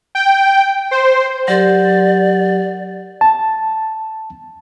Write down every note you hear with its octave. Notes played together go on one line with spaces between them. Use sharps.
G5
C5
F#3 G4 A#4 D5
A5